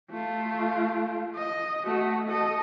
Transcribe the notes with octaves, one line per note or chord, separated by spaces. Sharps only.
A3 F4
D#5
A3 F#4
A4 D#5